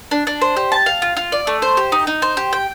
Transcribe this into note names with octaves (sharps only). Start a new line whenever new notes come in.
D4
D4
C5
G4
A5
F5
F4
F4
D5
A3
C5
G4
D#4
D#4
C5
G4
G5